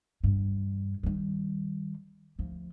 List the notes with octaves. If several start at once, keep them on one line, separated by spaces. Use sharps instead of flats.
E2 G2
D#3 G3
D2 F3